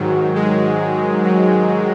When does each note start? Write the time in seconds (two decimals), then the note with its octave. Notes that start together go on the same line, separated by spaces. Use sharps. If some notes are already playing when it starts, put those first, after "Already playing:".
Already playing: G#2 D#3 F#3
0.35 G#3
1.24 F#3